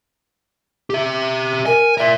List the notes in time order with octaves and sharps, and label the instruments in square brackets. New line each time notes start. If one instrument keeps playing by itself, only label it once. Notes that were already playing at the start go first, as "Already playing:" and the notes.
[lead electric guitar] G4 E5
[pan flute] A#4 [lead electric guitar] G#5
[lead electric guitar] A#4 D5 [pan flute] E5